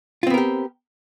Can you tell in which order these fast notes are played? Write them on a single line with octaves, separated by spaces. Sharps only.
F4 C4 B3 A#4 G4